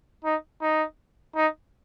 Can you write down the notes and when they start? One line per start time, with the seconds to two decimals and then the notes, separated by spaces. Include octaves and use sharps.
0.24 D#4
0.61 D#4
1.35 D#4